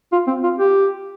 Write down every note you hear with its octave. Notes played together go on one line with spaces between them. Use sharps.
F4
C4
F4
G4